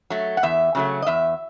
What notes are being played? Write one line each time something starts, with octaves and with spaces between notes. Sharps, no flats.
F#3 A3
F#5
E2 E5
C#3 F#3 A3
D#5
E2 E5